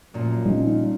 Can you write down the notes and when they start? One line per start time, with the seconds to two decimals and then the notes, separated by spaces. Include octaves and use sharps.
0.14 F#2 A#2 F3
0.46 G3 C#4 D#4